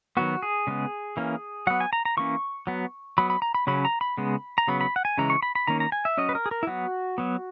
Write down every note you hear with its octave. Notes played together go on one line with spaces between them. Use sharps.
D#3 F#3 B3 F#4
G#4
C#3 G#3 B3
E3 A#3 C#4
F#3 B3 F#5
G#5
A#5
A#5
E3 A#3 C#4 C#6
F#3 B3
F#3 B3 B5
B5
A#5
B5
C#3 F#3 C#4 B5
A#5
B5
C#3 G#3 B3
A#5
C#3 F#3 B3 B5
B5
F#5
G#5
C#3 E3 G#3 C#4 A#5
C#6
B5
B5
D#3 A#3 C#4 A#5
A#5
G#5
E5
F#3 C#4 D#5
B4
A#4
G#4
A#4
E4
F#3 B3 F#4
F#3 B3